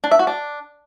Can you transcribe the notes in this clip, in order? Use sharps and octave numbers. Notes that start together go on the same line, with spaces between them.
D4
E5
F#4
D4